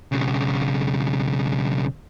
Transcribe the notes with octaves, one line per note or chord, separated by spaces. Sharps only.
B1 C#3